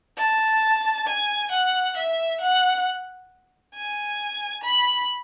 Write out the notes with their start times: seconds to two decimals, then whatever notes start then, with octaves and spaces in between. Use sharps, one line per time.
0.18 A5
1.07 G#5
1.52 F#5
1.97 E5
2.41 F#5
3.75 G#5
4.64 B5